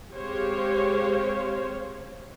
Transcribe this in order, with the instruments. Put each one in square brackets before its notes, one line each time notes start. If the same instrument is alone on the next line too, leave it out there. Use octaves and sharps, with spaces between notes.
[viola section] G#3 C4 G4 C5 C#5 F5